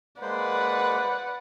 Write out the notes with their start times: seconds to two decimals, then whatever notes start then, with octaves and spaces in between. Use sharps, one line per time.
0.22 G#3 A#3 B4 C5 D5 F#5